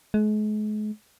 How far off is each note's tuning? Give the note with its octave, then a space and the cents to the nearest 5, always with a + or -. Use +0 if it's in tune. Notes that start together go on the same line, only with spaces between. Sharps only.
G#3 +40